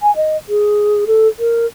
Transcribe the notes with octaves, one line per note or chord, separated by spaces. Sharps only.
G#5
D#5
G#4
A4
A#4